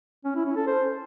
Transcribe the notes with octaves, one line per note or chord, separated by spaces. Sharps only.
C#4
E4
C#4
A4
C5